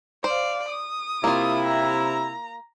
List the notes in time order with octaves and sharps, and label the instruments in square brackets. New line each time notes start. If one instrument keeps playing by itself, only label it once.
[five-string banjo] C5 [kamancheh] D5 F5
[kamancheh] D#6
[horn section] C3 E4 [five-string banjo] A#3 F4
[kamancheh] A#5